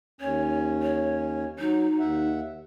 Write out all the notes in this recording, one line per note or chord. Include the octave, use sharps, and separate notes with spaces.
D#2 C#4 C#5
C#5
F#3 D#4
D#2 E5 F#5